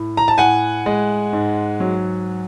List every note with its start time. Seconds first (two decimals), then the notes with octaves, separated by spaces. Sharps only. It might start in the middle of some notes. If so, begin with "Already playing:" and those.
Already playing: A2
0.17 A#5
0.28 A5
0.38 A2 F#5 G#5
0.86 G#3
1.33 G#2
1.80 F#3